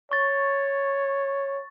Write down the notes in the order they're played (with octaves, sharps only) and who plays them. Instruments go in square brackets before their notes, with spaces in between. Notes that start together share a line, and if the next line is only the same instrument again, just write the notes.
[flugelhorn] C#5 [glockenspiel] C#6 A6